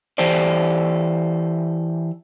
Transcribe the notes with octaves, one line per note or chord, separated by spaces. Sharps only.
E3 G4 A4 C5 D5